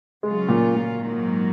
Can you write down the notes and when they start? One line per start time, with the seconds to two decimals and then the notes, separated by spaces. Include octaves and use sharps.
0.23 C#3 F#3 G#3 C#4 F4
0.49 A#2
0.75 A#2
1.01 G#2 D#3 F#3 A#3